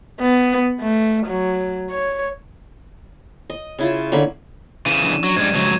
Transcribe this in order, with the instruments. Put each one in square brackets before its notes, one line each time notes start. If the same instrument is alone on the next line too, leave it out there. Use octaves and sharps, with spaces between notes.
[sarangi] B3
A3
F#3
C#5
[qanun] D#5
C#3 E4 F4
D3 A#3 C#4 B5
[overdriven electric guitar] C#3 E3 [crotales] D#7 E7
[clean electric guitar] F3 C#4 D4
[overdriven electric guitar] F#3
[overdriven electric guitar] G#2 G3 [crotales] G#6
[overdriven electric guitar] G#2 F#3 [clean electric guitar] C#3 F3